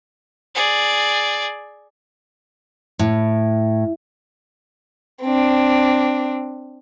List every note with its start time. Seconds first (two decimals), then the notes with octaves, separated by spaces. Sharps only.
0.55 G#4 D5
2.99 A2
5.23 C4 D4